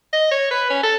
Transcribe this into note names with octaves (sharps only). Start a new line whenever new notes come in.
D#5
C#5
B4
C#4
A4